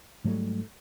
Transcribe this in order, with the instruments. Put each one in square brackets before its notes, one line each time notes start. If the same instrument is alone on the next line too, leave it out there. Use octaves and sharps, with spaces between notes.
[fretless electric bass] G#2 F#3 G3 A3